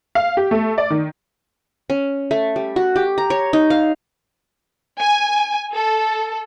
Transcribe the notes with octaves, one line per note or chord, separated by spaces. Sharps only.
F5
G4
A3
D5
D#3
C#4
A3
G3
F#4
G4
A#5
C#5
D#4
F5
G#5
A4